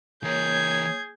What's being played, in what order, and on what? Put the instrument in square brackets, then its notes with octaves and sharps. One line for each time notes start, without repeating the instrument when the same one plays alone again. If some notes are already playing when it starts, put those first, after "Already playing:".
[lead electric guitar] E3 A#4 [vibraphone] A#3 C#5 [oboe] G#4 [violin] G6 G#6